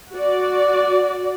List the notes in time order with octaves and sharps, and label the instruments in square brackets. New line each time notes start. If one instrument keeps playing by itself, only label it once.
[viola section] F#4 D5